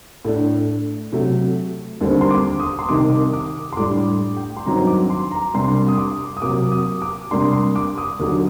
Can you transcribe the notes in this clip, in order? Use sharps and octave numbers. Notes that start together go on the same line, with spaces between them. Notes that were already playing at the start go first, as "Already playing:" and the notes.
A2 A3 D4
C3 F#3 A3
D#2 D3 G3 C4
C6
D6
D#6
C6
C2 C3 D#3 D6
D6
C6
A2 G3 D4 D6
G5
C6
G2 D#3 F#3 C4 A#5
D6
C6
A#5
C2 C3 G3 D4 C6
D#6
D6
D#6
C3 F#3 A#3 D6
D#6
D6
C3 G3 A#3 D4 C6
C6
D6
D#6
D#2 D3 F#3 A#3